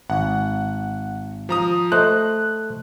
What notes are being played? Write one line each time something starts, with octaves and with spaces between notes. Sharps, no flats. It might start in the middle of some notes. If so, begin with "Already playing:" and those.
G#1 F#5
F3 A#5 D#6
A3 C5 D#5 F#6